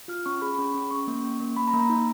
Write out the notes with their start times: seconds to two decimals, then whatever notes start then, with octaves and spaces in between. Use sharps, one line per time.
0.08 F4 F6
0.26 C#4 C#6
0.42 G#4 B5
0.58 C#4
0.75 C#4
0.91 C#4 C#6
1.07 A#3
1.23 C#4
1.40 A#3
1.56 A#3 B5
1.68 A#5
1.73 A#3
1.80 A#5
1.90 D#4